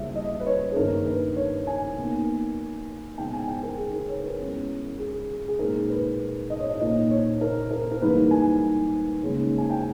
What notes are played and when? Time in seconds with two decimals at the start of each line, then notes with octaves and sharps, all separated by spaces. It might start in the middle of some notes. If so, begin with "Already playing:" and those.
Already playing: C#3 G3 A#3 E4 E5
0.15 D#5
0.40 B4
0.46 C#5
0.72 G#4
0.76 G2 D#3 A#3 D#4 A#4
1.07 B4
1.36 C#5
1.67 G#5
1.97 B2 A#3 D#4
3.18 B2 G#3 D#4 G5
3.33 G#5
3.48 G5
3.63 A#4
3.78 G#4
3.93 A#4
4.08 C#5
4.19 B4
4.23 A#4
4.39 B2 G#3 C#4 E4
4.99 G#4
5.48 G#4
5.59 A#2 G#3 D#4 A#4
5.90 B4
6.50 D#5
6.60 C#5
6.69 D#5
6.80 A#2 A#3 D#4 D#5
7.11 C#5
7.41 A#4
7.71 A#4
7.91 A#4
8.01 G#2 E3 G3 A#3 D#4 B4
8.31 G#5
9.22 D#2 C#3 G#3 C#4
9.58 G#5
9.70 G5